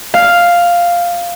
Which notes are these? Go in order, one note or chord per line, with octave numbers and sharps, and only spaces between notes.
F5